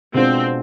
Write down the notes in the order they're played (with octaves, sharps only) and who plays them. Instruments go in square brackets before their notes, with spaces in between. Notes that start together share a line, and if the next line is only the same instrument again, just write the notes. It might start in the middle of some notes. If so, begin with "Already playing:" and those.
[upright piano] B2 G#3 D4 F4 [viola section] C4